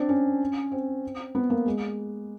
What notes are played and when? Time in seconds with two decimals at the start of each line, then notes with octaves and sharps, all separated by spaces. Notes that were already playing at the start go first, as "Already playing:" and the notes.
Already playing: C4 D4
0.09 C#4
0.72 C4
1.35 B3
1.50 A#3
1.66 G#3